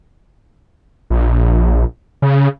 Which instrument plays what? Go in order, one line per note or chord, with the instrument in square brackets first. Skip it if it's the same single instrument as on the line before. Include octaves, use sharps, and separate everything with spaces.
[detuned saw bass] A#1
C#3